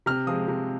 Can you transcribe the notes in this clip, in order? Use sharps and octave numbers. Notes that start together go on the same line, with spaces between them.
C3 F6
F3 G#3 D#6
C3